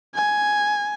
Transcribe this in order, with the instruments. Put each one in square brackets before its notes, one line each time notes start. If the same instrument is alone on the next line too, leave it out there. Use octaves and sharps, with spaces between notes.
[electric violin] G#5